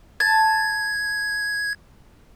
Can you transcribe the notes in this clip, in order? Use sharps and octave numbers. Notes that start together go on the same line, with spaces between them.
A5 G#6